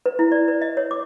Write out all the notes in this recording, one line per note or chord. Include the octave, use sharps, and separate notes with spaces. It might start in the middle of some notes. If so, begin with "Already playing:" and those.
B4
E4
D5
B4
D#5
C#5
D6